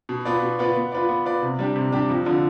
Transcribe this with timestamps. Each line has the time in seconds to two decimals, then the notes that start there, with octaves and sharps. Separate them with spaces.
0.09 B2
0.25 B3 F4 B4 D5
0.42 B2
0.59 B3 F4 B4 D5
0.76 B3
0.92 F4 B4 D5
1.09 B3
1.25 F4 B4 D5
1.42 C3
1.59 G3 D4 G4
1.76 C3
1.92 G3 D4 G4
2.09 F2
2.26 D3 F3